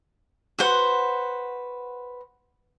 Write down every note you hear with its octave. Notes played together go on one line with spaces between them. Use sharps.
F#4 B4 C5 F#5